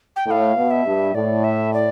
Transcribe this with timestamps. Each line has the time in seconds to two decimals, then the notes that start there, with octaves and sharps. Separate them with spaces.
0.16 G5
0.26 A2 F5 G5
0.56 B2
0.71 E5
0.85 G2
1.14 A2 D5
1.44 E5
1.74 D5